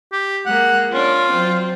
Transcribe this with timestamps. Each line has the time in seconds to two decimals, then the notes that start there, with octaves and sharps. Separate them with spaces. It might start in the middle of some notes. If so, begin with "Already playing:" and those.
0.13 G4
0.46 G#3 A#3 F#5
0.91 C#4 D4 F4 D5
1.30 F#3 C4